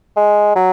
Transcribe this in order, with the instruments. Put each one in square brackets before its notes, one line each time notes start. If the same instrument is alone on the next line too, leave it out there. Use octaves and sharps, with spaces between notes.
[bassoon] G#3
F#3